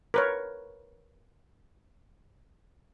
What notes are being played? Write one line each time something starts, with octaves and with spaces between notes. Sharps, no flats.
A#4 B4 C#5